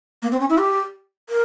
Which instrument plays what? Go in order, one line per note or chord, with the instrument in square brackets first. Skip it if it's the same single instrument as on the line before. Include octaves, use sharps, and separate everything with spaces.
[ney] A#3
C4
C#4
E4
G4
A#4